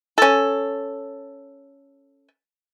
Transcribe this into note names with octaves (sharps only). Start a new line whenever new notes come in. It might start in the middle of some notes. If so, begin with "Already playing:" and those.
C#4 A4